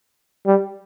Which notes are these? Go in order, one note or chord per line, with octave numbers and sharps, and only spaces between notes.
G3